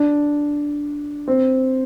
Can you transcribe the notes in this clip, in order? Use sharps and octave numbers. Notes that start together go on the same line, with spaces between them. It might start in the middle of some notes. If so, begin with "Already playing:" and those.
Already playing: D4
C4